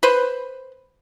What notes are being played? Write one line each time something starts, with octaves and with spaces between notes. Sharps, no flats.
B4 C5